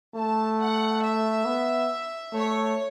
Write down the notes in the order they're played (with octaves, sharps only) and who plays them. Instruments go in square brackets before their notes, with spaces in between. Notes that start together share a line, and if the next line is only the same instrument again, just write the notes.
[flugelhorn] A3 [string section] A5
[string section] F#5
E5
[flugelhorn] B3
[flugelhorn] A3 [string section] C#5